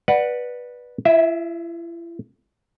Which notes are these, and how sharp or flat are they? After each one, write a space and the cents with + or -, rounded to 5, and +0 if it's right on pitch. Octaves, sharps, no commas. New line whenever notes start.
B4 -10 D5 +15 F#5 +0
E4 +40 E5 -15